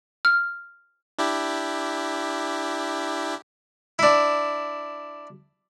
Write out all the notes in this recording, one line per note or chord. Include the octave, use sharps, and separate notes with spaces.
F6
D4 E4 G4
D4 E4